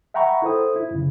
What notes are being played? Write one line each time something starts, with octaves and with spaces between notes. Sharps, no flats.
E5 F#5 G5 A#5 B5 C#6
E4 A4 C5 D#6
E4
F#2 C#3